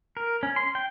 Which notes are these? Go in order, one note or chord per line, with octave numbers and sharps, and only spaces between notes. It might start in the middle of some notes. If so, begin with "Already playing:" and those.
A#4
C#4
C6
G5